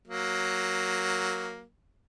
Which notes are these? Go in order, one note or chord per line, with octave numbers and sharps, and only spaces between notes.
F#3 A#3